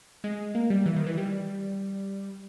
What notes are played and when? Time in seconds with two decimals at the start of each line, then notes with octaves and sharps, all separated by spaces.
0.24 G#3
0.55 A#3
0.70 G3
0.86 E3
0.96 D#3
1.07 E3
1.17 G3